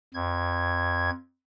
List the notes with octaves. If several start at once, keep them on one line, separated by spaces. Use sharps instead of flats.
F2 G#6